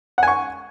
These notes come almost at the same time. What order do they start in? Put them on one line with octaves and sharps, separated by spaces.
F#5 G#5 C#6